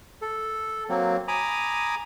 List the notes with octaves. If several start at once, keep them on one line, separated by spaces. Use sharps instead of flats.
A4
F#3 A#3 C4
G#5 A#5 B5 D6 D#6